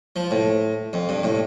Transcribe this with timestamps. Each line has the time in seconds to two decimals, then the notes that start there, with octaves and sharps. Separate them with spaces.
0.16 F3
0.31 A2
0.93 F2
1.09 G2
1.23 A2